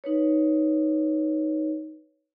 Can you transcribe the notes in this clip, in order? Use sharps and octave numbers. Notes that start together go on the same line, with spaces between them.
D#4 B4 C#5